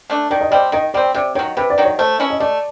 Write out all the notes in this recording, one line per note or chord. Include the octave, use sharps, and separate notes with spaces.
A3 D4
D#3 D5
D#5
G3 C4 D5
D#3 D#5
G3 C4 D5
C3 D5
D#3 F#3 C#5
C3 B4
D5
D#3 F#3
C#5
A3 C5
C#4 E4
D#5
A3 D5